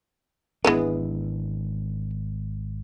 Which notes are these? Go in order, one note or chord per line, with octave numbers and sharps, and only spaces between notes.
G#1 E3 G#3 B3 D4